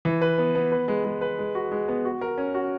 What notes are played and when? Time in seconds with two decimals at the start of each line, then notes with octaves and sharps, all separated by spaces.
0.05 E3
0.22 B4
0.38 B3
0.55 B3
0.72 B4
0.88 G#3
1.05 G#3
1.21 B4
1.39 G#3
1.55 F#4
1.72 G#3
1.88 B3
2.05 F#4
2.21 A#4
2.38 C#4
2.55 F#4